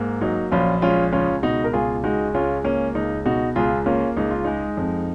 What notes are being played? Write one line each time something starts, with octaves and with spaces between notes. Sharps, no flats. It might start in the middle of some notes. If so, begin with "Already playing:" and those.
Already playing: G#2 A#3
F#3 D#4
A#1 C#4 F4
G#3 C#4 F4
C#2 C#4 F4
B2 D#4 F#4
A#4
C#2 F4 G#4
G#3 D#4 F#4
C#2 C#4 F4
A#3 C#4
C#2 D#4
B2 D#4 F#4
C#2 F4 G#4
A#3 C#4 F4
C#2 D#4
F4
G#3 D#4
F2